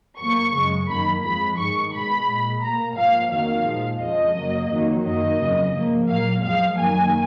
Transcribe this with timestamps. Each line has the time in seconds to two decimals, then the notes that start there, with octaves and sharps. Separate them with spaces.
0.19 F#2 F3 A#3 C#6
0.54 F#2 C#3 G#3
0.88 F#2 D#3 A#3 B5
1.23 F2 F3 G#3 B5
1.58 G#2 D#3 G#3 C#6
1.93 B2 G#3 B5
2.27 A#2 G#3
2.62 B2 A#3 A#5
2.97 G#2 F3 A#3 F5
3.31 F2 D#3 F#3 A#3 F5
3.66 A#2 F3 G#3
4.01 F2 C#3 F3 G#3 D#5
4.36 F#2 C#3 F#3 A#3
4.70 F2 D#3 F#3 A#3
5.05 F#2 D#3 A#3 D#5
5.40 F2 C#3 F#3
5.74 G#2 F3 A#3
6.08 A#2 F#3 A#3 F5
6.44 F#2 F3 G#3 F5
6.78 F#2 D#3 F#3 A#3 G#5